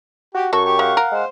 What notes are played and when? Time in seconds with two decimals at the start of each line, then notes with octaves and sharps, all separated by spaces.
0.35 F#4 G4
0.53 F#2 F#4 A4 C#6
0.65 G4 C#6
0.79 G#3 F5 F#5
0.97 A#4
1.11 G#3 C5